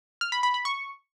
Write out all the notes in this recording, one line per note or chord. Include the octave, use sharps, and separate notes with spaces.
F6
B5
B5
B5
C#6